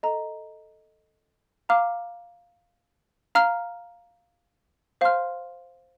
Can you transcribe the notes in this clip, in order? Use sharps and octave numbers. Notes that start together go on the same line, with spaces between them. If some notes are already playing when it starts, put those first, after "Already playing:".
A4 D#5 A#5
F5 A#5 D6 F6
F5 A#5 F6
C5 F5 A5 C6 F6